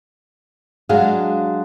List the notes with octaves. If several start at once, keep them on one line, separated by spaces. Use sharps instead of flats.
F#3 G#3 D4 F#4 G#4 F5